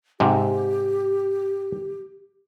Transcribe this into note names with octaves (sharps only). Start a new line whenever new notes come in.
G#2 C3 G4